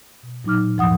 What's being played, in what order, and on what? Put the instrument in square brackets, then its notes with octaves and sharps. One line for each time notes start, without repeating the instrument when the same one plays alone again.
[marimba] B2
A#2 F#3 D#4 D6 F6
D#2 G#2 F3 F#5 D#6